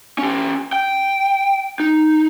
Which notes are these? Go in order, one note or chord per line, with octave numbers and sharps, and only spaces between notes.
C#4 G4
G5
D#4